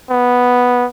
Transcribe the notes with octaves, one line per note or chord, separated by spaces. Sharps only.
B3